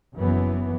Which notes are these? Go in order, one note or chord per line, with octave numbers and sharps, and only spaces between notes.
F#1 F#2 E3 B3